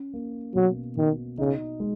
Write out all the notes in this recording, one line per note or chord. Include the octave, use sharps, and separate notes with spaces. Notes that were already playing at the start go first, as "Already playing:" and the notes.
Already playing: C#4
A#3
B2 F#3
B2 D#3
C#3 D#4
G#3